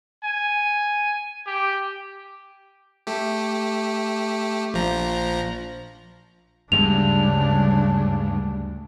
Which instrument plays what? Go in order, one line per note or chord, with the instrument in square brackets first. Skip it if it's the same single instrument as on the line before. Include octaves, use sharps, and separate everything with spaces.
[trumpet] G#5
G4
[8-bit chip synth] A3 G4
A#1 F3 A#5
[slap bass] D2 G3 G#3 [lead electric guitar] G2 [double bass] C#3 D4 [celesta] F7